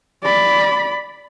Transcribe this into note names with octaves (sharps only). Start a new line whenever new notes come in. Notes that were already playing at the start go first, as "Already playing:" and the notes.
D5 B5